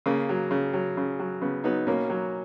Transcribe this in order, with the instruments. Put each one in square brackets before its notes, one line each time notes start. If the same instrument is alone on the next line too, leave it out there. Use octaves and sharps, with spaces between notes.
[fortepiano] C#3 A#3
F#3
C#3
F#3
C#3
F#3
C#3 B3
F#3 B3 D#4
B2 A#3 C#4
F#3